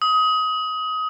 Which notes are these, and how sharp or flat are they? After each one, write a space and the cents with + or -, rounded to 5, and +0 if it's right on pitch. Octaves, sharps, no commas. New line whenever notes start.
D#6 +25